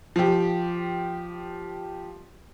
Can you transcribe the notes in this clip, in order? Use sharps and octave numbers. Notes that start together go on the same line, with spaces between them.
F3 G4